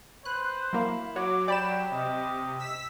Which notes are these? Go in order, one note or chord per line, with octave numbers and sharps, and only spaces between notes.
B4 C5 F#6
F#3 A#3 E4 F5
F#3 F#4 C#5 D6
G4 D5 G5 B5 E7
C3 D#5
E6 B6